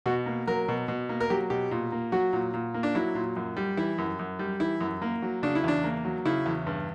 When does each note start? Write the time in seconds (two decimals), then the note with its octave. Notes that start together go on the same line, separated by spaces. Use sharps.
0.06 B2 F#4
0.26 A#3
0.47 F#3 A#4
0.68 B2
0.88 B2
1.09 A#3
1.20 A#4
1.30 F#3 G4
1.50 B2 G4
1.71 A#2
1.92 A#3
2.12 F#3 F#4
2.33 A#2
2.54 A#2
2.74 A#3
2.83 D4
2.95 F#3 E4
3.15 A#2
3.36 F#2
3.57 G3
3.77 E3 E4
3.98 F#2
4.19 F#2
4.39 G3
4.60 E3 E4
4.81 F#2
5.02 A#3
5.22 F#3
5.43 C#3 D4
5.55 E4
5.64 E2 D4
5.84 A#3
6.05 F#3
6.25 C#3 E4
6.46 E2
6.67 G2